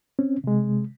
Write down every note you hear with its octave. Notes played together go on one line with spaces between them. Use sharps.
C4 C#4
C3 G#3